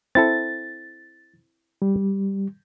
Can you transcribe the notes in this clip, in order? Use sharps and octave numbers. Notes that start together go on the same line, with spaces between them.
C4 E4 A4 A6
G3